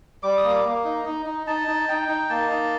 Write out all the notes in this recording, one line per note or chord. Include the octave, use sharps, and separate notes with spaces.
G3 D6
D#6
A#3
D6
A#3
D#4
D#4
D#4
D#4 A5
D#4
D#4 G5
D#4
A#3 A5
D#4